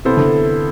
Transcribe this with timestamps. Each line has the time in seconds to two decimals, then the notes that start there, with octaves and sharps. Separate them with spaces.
0.05 C3 B3 E4 A4 C5
0.17 D3